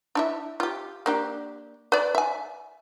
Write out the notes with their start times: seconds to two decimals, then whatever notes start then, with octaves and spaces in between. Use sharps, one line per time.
0.15 D4 E4 E5
0.60 F4 G4
1.06 A#3 D4 G4
1.92 B4 D5
2.15 E5 G#5